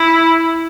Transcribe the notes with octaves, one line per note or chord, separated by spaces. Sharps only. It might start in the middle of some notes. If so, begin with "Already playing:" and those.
Already playing: E4